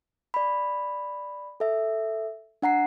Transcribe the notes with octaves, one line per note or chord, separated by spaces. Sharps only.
D5 B5
A4 E5
D4 F#5 A#5 C7